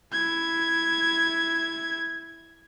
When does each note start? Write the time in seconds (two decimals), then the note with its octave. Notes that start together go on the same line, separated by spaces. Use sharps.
0.13 E4 G#6